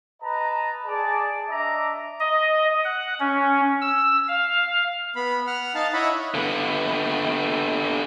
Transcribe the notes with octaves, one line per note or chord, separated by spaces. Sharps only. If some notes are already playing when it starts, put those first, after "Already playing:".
B4 D#5 A5 A#5
G#4 D5 A5
D4 D#5 E5 A#5 D6
D#5
F#5
C#4
E6
F5
B3 B5
F#5 F6
D#4 F5 A5
E4 C#5 D#5 E5 F#5 B5
D3 B3